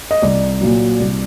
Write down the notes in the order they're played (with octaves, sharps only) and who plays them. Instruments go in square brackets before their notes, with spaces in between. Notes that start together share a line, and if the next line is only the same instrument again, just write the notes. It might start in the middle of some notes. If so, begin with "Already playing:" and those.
[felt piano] D#5
C2 D5
A#2 F#3
C2